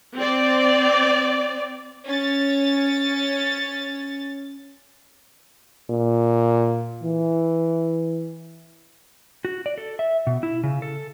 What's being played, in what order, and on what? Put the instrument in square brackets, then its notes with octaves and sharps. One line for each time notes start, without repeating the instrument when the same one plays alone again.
[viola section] C4 D5
[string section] C#4 A6
[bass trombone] A#2
E3
[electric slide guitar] F#4
D5
A4
E5
B2
E4
C#3
A4